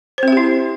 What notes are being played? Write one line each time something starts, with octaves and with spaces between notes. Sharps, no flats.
C4 E4 G4 C5 E5